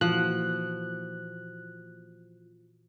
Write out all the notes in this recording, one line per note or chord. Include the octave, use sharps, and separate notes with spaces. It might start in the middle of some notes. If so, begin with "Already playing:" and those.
A#2 E3 F3 F#4 F#6